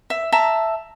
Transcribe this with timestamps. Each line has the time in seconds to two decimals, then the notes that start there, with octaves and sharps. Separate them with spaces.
0.10 E5
0.32 E5 A5 A#5